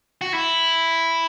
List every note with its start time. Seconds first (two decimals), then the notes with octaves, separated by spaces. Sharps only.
0.21 F#4
0.34 E4